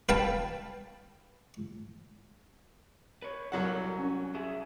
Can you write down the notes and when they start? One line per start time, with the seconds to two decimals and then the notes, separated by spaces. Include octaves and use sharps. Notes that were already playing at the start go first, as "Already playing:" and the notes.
0.09 B4 F5 G5 A5
3.22 B4 C#5
3.52 C2 F#3 A4 A#4 C#5 F#5
3.99 C#4
4.35 G#4 E5